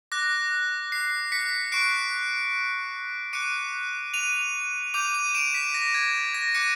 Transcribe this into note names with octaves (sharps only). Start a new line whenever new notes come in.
D6 F#6 A#6
C7
B6 C#7
C#6 F#6 C7 D7
D6 F#6 C#7 D#7
D#7 F7
D6 G6 D#7 F7
D#7 F7
D7 E7
B6
A#6
G#6
G#6
A#6
D6 F#6 C#7 D#7